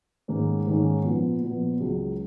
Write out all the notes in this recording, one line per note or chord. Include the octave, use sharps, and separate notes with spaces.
G#2 D#3 A#3 C#4
G#2 D#3 A#3 C#4
A#2 F3 B3
A#2 F3 B3
C#2 C#3 F#3